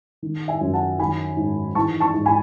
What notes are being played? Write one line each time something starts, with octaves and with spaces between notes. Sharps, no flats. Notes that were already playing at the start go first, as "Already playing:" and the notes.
D#3
E5 G#5
F#2
F#5 A5
D#3 G#5 B5
G#2
E3 A5 C#6
A5 C#6
G#2
G#5 B5